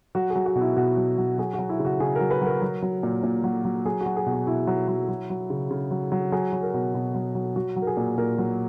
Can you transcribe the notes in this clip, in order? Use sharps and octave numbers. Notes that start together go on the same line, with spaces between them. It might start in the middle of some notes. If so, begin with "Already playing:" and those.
F#3 F#4
G#4
F#3
F#4
B2
E4
B2 F#4
F#3
F#3
F#3 G#4
F#4
F#3
E4
C#3
F#4
C#3 G#4
A#4
F#3
B4
F#3 A#4
F#3
F#3
A#2
A#2
F#3
F#3
F#3 G#4
F#4
F#3
G#4
B2
F#4
B2 E4
F#3
F#3
F#3
F#3
C#3
C#3
F#3
F#3
F#3 G#4
F#3
A#4
B2
B2
F#3
F#3
F#3 F#4
F#3
A#4
G#4
A#2
A#2 A#4
F#3